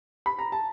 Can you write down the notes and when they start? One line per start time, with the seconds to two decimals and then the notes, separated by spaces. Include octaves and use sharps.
0.26 B5
0.39 A#5
0.52 A5